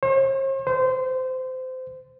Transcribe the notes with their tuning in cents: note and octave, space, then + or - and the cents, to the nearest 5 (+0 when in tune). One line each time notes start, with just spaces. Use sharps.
C5 +45
C5 -25